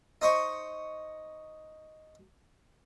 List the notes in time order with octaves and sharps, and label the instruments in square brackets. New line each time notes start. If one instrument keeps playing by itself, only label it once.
[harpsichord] D#4 C5 D#5 C#6